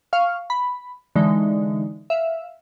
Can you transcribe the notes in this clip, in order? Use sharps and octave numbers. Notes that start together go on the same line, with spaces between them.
F5 C#6 F6
B5
D3 E3 G#3 D#4
E5 F5